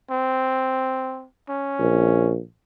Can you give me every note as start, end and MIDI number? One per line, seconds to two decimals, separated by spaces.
0.11 1.26 60
1.49 2.34 61
1.79 2.37 34